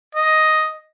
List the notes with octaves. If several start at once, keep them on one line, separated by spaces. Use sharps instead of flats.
D#5